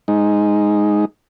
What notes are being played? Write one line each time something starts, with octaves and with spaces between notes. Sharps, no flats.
G#3 D#4